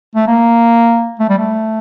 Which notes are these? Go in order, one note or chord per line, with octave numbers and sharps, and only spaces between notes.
A3
A#3
A3
G3
A3